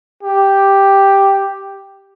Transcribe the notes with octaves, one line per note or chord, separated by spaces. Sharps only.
G4